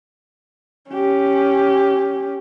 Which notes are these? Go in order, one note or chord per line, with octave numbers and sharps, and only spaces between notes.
C#4 G4